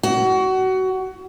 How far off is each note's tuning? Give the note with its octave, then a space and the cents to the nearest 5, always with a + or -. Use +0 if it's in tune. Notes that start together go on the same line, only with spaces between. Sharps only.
F#4 +25